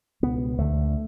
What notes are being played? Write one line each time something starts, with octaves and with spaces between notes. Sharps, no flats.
C#2 B2 B3
D2 D3 A3